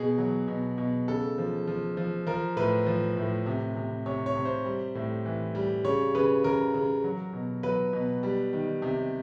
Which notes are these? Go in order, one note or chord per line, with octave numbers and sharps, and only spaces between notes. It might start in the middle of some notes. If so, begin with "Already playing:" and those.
Already playing: B2 G#4
F#3
B2
B2
C#3 A4
F3
F3
F3
F3 A#4
A2 B4
F3
A2
C3
C3
C3 C#5
C#5
C3
C5
G3
A2
E3
G3
C#3 C#5
C#3 B4
C#3 A#4
C#3
F#3
B2
F#3 B4
B2
G3
D#3
C3